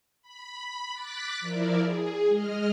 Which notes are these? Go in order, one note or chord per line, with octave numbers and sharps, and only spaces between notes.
B5
D6 F#6 A6 B6
F3 E4 A#4 D5
G#4
G#3 D#5 F6